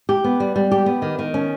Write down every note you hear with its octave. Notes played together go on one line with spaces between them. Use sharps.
G4
B3
G3
G3
G4
B3
D#3
D#3
C#4